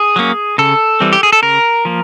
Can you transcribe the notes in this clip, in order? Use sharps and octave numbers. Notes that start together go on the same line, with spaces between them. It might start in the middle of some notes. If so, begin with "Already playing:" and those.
Already playing: G#4
F#3 A#3 C#4
C#3 A4
E3 G3 C4
G4
G#4
A4
C#3 A#4
F3 A#3